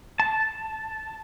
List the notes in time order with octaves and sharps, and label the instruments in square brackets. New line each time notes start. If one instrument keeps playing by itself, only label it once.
[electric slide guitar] A5